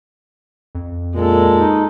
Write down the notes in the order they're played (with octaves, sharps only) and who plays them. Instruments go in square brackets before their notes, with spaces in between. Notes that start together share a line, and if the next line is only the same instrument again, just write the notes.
[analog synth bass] F2
[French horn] A#2 [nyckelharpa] G#3 A4
[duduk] D#4